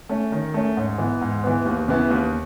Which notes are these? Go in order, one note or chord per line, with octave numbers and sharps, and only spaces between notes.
A3 C#4
D#3
A3 C#4
G#2
E3 B3
G#2
E3 B3
D#2
C#3 E3 B3 E4
D#2